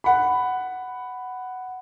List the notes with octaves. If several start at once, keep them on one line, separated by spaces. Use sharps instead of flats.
F#5 B5